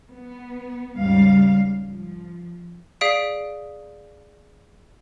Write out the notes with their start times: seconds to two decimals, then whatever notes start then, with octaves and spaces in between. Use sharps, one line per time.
0.11 B3
0.96 D#2 G#2 C#3 G3 F5
1.84 F3
3.01 G#4 D5 F5 D#6 B6 D7